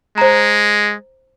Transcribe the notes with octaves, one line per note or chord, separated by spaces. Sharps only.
G#3 C5 A#5